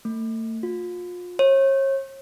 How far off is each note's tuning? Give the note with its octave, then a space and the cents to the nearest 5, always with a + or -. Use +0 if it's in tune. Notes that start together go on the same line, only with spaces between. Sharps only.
A3 +40
F4 +35
C#5 -40